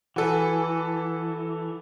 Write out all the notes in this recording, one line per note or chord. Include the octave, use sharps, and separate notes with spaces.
E3 F#4 A4 B4